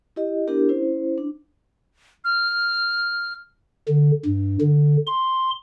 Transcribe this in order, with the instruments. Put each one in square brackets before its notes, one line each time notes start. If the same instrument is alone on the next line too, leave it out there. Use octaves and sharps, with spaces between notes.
[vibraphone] E4 G4 D#5
B3 D4 E4 G4 A#4
C#4 E4 C5
D4
[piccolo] F6
[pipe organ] D3
G2
D3
C6